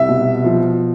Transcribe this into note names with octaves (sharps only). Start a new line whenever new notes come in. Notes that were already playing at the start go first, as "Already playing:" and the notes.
Already playing: C2 E5
B2
F3